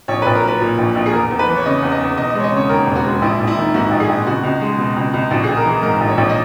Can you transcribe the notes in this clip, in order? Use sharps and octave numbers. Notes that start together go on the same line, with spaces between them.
A#1 C#5
A#1 B4
A#4
F#3 B4
A#2
A#1
A#1
G#4
E2 A#4
E2
B4
E3
C#5
C#3 D#5
E2
D#5
E2
E1 D#5
D#5
G#3 C#5
D#5
C#3 C#5
D#2 A#4
E1
F#4
G#3
A#1 E4
A#1
E4
D#3
G#2 F#4
A#1
G#4
A#1
C#2 F#4
C#2
G#3
B2
C#2
C#2
A#1 F#4
G#4
A#1
A#4
E3 G#4
G#2 A#4
A#1
C#5
A#1
D#5